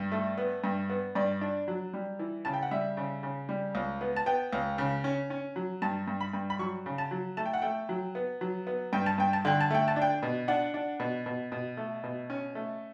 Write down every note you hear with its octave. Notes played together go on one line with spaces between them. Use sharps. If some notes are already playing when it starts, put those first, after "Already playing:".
Already playing: G2
A3
B3
G2
B3
G2 D5
D4
F#3
G3
E3
C#3 A5
G5
F#5
G3 E5
C#3
C#3
G3
C#2
B3
A5
B3 G5
C#2
C#3
C#4
C#4
F#3
G2 A5
G2
B5
G2
B5
F#3 C#6
C#3
A5
F#3
A3 A5
G5
F#5
A3 G5
F#3
B3
F#3
B3
G2 G5
A5
G2 G5
A5
D3 G5
A5
A3 G5
A5
D4
G5
B2
D4 F#5
D4
B2
B2
B2
A3
B2
C#4
A3